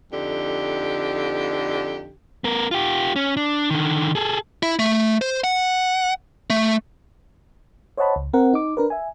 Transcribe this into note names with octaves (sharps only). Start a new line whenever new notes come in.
F2 D3 D#4 G4
B3 A#4
F4 G4
C#4
D4
D3 D#3
G#4 A4
E4
A3
C5
F#5
A3
C5 C#5 D#5 F#5 A5 B5
C#2
C4 A#4 F#5
D#4 D6
D4 A#4 B4
E5 G#5